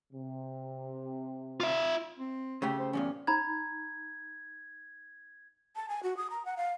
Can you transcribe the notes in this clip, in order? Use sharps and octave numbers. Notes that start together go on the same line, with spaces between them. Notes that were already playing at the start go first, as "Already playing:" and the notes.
C3
F4 E5
C4
C#3 A3 G4
C5
E2 G2 A#2 C#4
D#4 A#5 B5 G#6
A5
G#5
F#4
D#6
A#5
F#5
F5